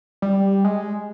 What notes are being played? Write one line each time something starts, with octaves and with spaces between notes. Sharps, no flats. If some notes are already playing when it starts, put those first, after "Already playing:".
G3
G#3